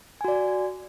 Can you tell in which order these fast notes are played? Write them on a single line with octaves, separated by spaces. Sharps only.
G#5 F#4 D5